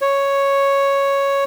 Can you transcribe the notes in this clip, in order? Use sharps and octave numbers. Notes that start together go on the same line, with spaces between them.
C#5